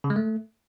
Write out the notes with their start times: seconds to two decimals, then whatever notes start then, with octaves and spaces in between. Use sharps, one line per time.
0.04 C#3
0.10 G#3
0.16 A3